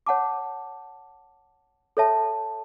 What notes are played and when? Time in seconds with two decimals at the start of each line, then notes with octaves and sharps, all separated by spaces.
0.06 C#5 F#5 A5 D6
1.97 A4 C#5 E5 A5